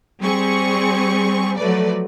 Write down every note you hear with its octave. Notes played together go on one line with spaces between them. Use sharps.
G3 C4 G#4 C#6
F3 F#3 A3 B4 D5